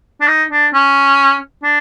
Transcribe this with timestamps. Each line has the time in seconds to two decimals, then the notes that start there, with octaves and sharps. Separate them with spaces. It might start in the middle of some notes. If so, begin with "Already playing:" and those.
0.21 D4
0.28 D#4
0.51 D4
0.74 C#4
1.63 D4